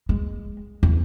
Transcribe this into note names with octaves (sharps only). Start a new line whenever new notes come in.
G#3
E2